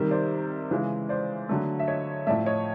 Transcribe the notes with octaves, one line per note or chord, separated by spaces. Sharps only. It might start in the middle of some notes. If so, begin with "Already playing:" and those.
Already playing: C3 D#3 G3
C5 D5
C#3 E3 G#3
C5 D5
D3 F#3 A3
E5
C#5 D#5
A2 F3 A3 D5 E5
C#5 D#5